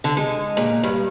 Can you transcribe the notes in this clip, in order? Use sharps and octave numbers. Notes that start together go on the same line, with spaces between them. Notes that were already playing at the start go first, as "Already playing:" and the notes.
D3
G#3
A#2
G2